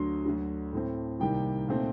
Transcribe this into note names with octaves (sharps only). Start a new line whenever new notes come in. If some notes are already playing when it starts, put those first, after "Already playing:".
Already playing: D2 D3 F#3 C6
D2 D3 F#3
A2 A3 C4
C2 C3 D#3 G3 A#3 G5
A#2 A3 C4 D#4